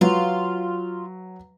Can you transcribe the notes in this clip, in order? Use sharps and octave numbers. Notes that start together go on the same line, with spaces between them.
F#3 F4 B4